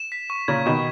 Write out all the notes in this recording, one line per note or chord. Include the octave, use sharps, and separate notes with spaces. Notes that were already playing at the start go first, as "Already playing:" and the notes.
Already playing: E7
B6
C#6
A#2 C#3 G#6
B2 D#3 E7